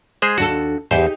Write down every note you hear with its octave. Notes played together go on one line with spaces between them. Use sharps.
G#3 G#4 C5
D#2 D4 F#4 A4
E2 D#4 G4 G#4 C5